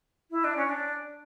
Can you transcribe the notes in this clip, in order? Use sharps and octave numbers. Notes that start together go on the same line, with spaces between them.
E4
D4
C#4
D4